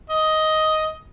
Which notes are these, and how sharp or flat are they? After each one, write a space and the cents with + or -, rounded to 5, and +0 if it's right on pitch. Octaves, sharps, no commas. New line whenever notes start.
D#5 +10